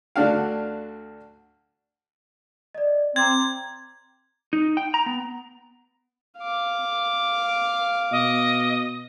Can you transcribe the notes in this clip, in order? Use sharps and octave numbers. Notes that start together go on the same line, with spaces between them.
D2 D3 D4 F#4 F5
D5 D#5
C4 A#5 D6 G#6 A6
D#4
G5
A#5
B3
F5 D6
B2 D#5